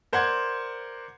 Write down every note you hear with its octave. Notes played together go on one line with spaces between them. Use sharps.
A#4 C5 D5 F#5 C6 G#6